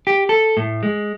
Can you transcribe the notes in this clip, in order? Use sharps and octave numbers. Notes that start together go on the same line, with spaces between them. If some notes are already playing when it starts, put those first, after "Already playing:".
G4
A4
A2
G#3